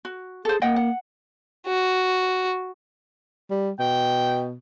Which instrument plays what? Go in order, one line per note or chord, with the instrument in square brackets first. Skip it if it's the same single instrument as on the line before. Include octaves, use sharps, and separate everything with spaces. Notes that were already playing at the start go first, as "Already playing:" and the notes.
[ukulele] F#4
[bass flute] G#4 [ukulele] A4 C5
[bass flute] A#3 [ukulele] D#5 F#5 G5
[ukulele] F#5
[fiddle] F#4
[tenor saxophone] G3
[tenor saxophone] B2 [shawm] G5